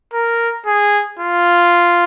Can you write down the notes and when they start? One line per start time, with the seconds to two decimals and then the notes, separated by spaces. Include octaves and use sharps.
0.14 A#4
0.66 G#4
1.19 F4